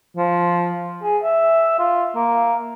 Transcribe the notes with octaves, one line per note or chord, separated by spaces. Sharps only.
F3
G#4
E5
F4
A#3